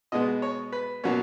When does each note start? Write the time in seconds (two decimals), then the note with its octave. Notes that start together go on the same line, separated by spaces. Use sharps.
0.12 B2 G#3 B3 D#5
0.42 C#5
0.72 B4
1.04 B2 F#3 A#3 C#4